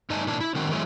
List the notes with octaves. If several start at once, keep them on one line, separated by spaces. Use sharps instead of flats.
G2 A3 D#4 D#5 G#5 A5
A#2 E3 D4 E4 A5
E4
D3 D#3 C4 F#4
E3 F#3 G#3 A3